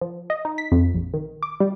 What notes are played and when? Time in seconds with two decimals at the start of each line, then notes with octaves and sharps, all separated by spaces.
0.01 F3
0.30 D#5
0.45 D#4
0.58 B6
0.72 F2
0.95 A#1
1.14 D#3
1.43 D6
1.60 G3